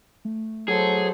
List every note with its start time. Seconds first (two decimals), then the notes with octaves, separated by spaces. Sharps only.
0.25 A3
0.68 F#3 G#4 A4 C5